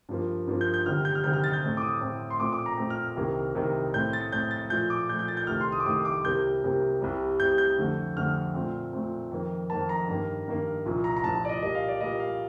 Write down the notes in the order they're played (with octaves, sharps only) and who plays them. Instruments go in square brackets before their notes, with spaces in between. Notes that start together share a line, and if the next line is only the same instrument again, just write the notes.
[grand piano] G2 F3 A#3
G2 F3 A#3
G6
G6
D2 C3 D#3 G3 F6
G6
F6
D2 C3 D#3 G3 G6
F6
A6
G6
A2 A3 C4
D6
D#6
A2 A3 C4
C6
A#2 A3 C4 D6
D6
A#5
A#2 A3 C4
F6
C2 C3 D#3 A#3
C2 C3 D#3 A#3
A2 A3 C4 G6
A6
A2 A3 C4 G6
A6
A#2 F3 A3 G6
D6
A#2 F3 A3 G6
G6
A6
G6
C2 C3 D#3 A3 F6
C6
D#6
D6
C2 C3 D#3 A3 D#6
D6
C2 C3 G3 A#3 G6
C2 C3 G3 A#3
C2 C3 G3
C2 C3 G3 G6
G6
F2 D3 A3
F2 D3 A3 F6
A#2 A3 C4
A#2 A3 C4
F2 D#3 A#3
F2 D#3 A#3 A5
A#5
G2 D#3 A#3
G2 D#3 A#3
C2 A#2 F3
A#5
A#5
C2 A#2 F3 A5
D5
D#5
A#2 G3 A#3 D#5
F5
D5
A#2 G3 A#3 D#5
F5